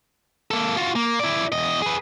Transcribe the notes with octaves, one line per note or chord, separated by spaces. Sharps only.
A#3 A4
F4 F#4
A#3
E4 D5
E2 D#5
G#4 B4